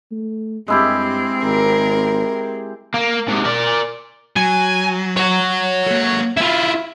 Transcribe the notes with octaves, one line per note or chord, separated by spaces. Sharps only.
A3
G2 G#3 C4 E4 G4
G#1 A#4
A#3
G#2 C3
A#4 D5
F#3 G#5
C#5 F#5
A#3 A4
E4 F4 E5